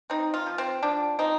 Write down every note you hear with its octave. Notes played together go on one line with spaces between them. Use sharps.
C4 D#4
F4
F3
C4
F3 D4
C4 D#4